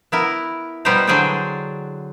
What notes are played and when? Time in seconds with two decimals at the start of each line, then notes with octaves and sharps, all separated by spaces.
0.12 B3 E4 A#4
0.85 B2 G3 B3 G4 C5 A#5
1.07 D3 F#3 G#4 C5 D5 G5